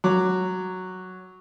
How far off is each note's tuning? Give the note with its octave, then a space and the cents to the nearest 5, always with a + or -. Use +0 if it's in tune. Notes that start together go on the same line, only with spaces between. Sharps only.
F#3 +0 D6 +0